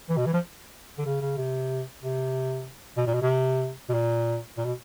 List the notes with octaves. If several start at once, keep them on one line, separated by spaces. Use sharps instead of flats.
E3
B2
E3
F3
D3
C#3
C#3
C3
C3
B2
A#2
B2
C3
B2
A#2
A#2
B2